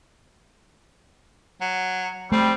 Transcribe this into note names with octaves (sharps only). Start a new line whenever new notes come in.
F#3
G3 A3 C4